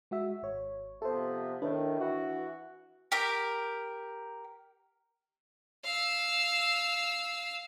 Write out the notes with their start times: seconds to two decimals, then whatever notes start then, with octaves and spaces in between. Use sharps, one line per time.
0.11 G#3 F#4 E5
0.42 G#1 C#5
1.02 C3 F3 B3 A4 C5
1.62 A2 D#3 D4 B4
1.99 E3 F#4
3.12 G4 A#4
5.84 F5 E6